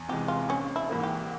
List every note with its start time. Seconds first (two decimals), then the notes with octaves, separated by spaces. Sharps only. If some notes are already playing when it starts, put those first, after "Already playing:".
Already playing: E2
0.09 C3 E3 G#3 G4
0.28 F4
0.49 A#1 C#4
0.76 E4
0.90 G#2 E3 A#3
1.03 G4